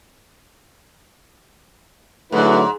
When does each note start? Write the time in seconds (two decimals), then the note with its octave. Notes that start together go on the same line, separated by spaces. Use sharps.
2.32 G#2 D3 F#3 A3 E4 F#4 B4